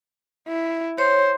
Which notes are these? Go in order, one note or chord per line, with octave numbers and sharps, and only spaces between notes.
E4
C5 C#5